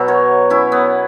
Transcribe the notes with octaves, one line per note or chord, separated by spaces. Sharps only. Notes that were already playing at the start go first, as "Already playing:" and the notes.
Already playing: B2 F#3
A#4 C#5
C#4 E4
B3